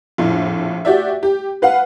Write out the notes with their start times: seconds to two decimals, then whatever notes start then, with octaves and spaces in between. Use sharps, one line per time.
0.18 A#1 F2 A2
0.85 F#4 G4 D5 E5
1.23 G4
1.62 B4 F5 F#5